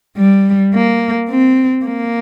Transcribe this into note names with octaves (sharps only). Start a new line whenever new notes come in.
G3
A#3
C4
A#3